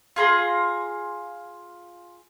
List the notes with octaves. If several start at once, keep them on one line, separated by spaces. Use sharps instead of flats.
F4 G#4 A#5 C6